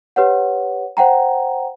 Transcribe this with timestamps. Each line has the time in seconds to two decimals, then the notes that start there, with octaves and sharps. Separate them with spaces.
0.16 G4 B4 C#5 F#5
0.97 C5 F#5 G5 A#5